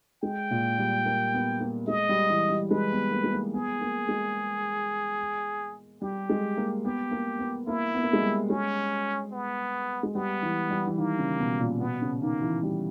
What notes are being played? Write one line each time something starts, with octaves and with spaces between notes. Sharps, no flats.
G#3 G5
A#2
G3
A#3
B3
A#3
G#3 D#5
G3
E3
G3
G#3 B4
B3
A#3
G#3
A#3
B3 G#4
A#3
G#3
G3 G4
G#3
A#3
B3 G4
A#3
B3
A#3 E4
B3
A#3
G#3
G3
G#3 C#4
B3
G#3
G3 B3
E3
G3
E3
D#3 A#3
C#3
B2
A#2
B2 B3
C#3
D#3 A#3
E3
G3